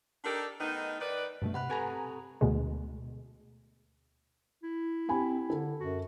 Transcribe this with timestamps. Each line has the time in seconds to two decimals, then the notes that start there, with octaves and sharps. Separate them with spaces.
0.25 D4 D#4 G4 A4 A#4 D5
0.60 D#3 A3 B3 D#4
1.00 D#3 B4 D5
1.42 G2 B2 A3
1.54 C3 F#5 B5 F#6
1.69 C4 G4 A4 B4 G#5 A#5
2.41 D2 B2 G#3
4.63 E4
5.09 C4 G4 G#5 B5
5.50 D3 A4
5.80 F#2 F#4